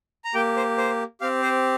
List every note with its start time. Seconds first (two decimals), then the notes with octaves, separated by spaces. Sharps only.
0.24 A#5
0.34 A#3 G4 G5
0.56 C5
0.78 C5
1.21 C4 G4 F5
1.42 C5